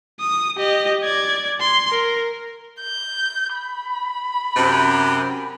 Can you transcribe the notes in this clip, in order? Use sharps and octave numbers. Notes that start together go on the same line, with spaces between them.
D#6
G4 D#5
D5 G#6
C6
A#4
G6
B5
F#2 C3